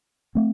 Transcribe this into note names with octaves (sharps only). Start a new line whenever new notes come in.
A3 C4